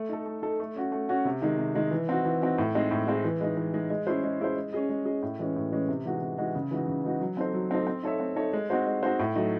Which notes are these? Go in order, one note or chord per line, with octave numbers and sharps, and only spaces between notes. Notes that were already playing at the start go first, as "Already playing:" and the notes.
Already playing: A3
D#4 A4
A3
D#4 A4
A3
C#4 F#4
A3
C#4 F#4
C3
D#3 G#3 D#4
C3
D#3 G#3 D#4
E3
C4 D#4 F#4
E3
C4 D#4 F#4
A2
G#3 C4 D#4 G#4
A2
G#3 C4 D#4 G#4
E3
G#3 D#4
E3
G#3 D#4
G#3
C#4 E4 G#4 C5
G#3
C#4 E4 G#4 C5
G#3
C#4 G#4 D#5
G#3
C#4 G#4 D#5
A2
E3 G#3 C#4
A2
E3 G#3 C#4
C3
E3 G#3 D#4 F#4
C3
E3 G#3 D#4 F#4
C#3
E3 G#3 D#4 F#4
C#3
E3 G#3 D#4 F#4
F#3
C4 D#4 A4 C5
F#3
C4 D#4 A4 C5
C4
D#4 A4 C#5 E5
C4
D#4 A4 C#5 E5
G#3
C4 D#4 F#4 C5
G#3
C4 D#4 F#4 C5
A2
F#3 A3 D#4